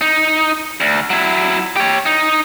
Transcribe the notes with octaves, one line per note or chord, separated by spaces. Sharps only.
D#4
D2
F#3 E4
G4 C#5
D#4